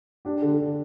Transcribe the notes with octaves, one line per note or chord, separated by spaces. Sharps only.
D4 G4
D3
D3